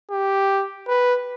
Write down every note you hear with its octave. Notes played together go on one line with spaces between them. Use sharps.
G4
B4